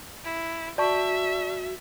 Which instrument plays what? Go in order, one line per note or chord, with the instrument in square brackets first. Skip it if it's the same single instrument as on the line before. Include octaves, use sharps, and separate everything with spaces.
[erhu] E4
[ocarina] F#4 [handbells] D5 A5 C#6 [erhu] E5